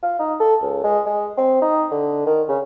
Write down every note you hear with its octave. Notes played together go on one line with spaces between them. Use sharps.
F4
D#4
A4
C#2
G#3
G#3
C4
D#4
D3
D#3
C#3